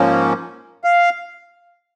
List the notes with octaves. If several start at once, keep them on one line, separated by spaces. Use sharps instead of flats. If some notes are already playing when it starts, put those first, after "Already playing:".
Already playing: G#2 F3 A#3 C#4
F5